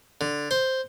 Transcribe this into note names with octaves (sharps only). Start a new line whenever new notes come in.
D3
C5